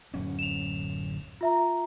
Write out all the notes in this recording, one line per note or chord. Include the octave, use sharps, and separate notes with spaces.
D1 F#2 C#4
E7 F7
F4 E5 A#5